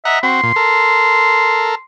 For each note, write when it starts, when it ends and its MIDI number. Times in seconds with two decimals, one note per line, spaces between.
0.05 0.19 75
0.05 0.18 76
0.05 0.19 78
0.05 0.19 82
0.23 0.41 60
0.23 0.41 66
0.23 1.85 84
0.43 0.52 46
0.56 1.75 69
0.56 1.75 70